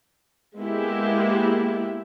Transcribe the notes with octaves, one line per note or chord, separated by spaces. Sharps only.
G#3 A#3 B3 E4 G4